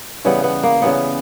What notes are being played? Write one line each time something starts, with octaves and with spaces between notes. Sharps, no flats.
C#3 E3 G3 B3
B3
A#3
C#3 E3 G3 B3